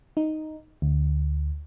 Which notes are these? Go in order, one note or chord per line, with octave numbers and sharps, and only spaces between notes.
D#4
D2